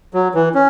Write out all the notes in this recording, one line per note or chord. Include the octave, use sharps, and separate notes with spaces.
F#3
E3
C#4